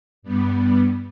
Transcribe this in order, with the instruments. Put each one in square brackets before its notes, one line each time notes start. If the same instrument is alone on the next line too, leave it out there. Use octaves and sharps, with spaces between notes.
[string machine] G2 G3 B3